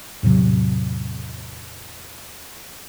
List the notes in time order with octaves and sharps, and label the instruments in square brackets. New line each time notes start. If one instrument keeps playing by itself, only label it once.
[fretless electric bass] E2 A2 C3 F#3